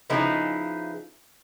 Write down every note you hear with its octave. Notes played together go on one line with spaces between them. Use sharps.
C#3 F3 B3 D#4 E4 G#4